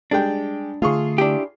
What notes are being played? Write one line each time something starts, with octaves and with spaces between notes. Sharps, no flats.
G3 G#3 D4 G5
D3 A3 F4 G#4 C#6
D4 E4 G4